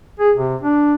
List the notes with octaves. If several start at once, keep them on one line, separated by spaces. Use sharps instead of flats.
G#4
C3
D4